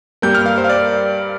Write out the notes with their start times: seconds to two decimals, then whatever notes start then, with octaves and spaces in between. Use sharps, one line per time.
0.22 G2 G3 A#3 G4 A#4 G6
0.35 F6
0.46 F5
0.58 C5
0.64 F5
0.70 D5